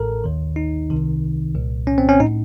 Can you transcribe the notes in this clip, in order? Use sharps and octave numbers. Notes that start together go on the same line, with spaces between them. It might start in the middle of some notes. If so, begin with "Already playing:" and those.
Already playing: A1 A2 A4 A#4
D#2 D#3
D#4
C2 C3 D#3
C2 A#2
C#4
C4
C#4
A2 D#4